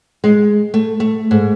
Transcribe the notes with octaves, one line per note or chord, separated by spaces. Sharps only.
G#3
A3
A3
G#2